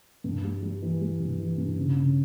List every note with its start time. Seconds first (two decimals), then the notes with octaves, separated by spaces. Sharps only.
0.24 G2
0.44 G3
0.63 G3
0.82 E3
1.01 G3
1.20 G2
1.40 E3
1.58 G2
1.77 C#3
1.96 C#3